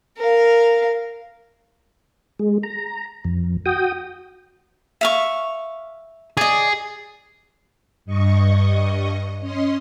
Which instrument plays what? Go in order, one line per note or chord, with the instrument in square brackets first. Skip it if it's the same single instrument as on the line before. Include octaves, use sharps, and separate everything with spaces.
[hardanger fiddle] A#4 F5
[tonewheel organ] G#3
A#5
F2
F#4 G5 D#6
[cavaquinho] E5 F5 C#6
[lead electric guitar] G#4 [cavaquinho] D5 D#5
[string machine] G2 D#5 C#6
C#4 D#5 C6